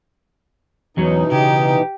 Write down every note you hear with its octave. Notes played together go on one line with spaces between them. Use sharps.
E2 B2 E3 F#3 C#4 D#4
C#3 G4